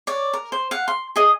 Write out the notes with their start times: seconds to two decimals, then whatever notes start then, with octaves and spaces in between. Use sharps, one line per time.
0.07 C#5 D5
0.33 A#4
0.52 C5
0.71 F5 F#5
0.88 C6
1.16 G#4 D#5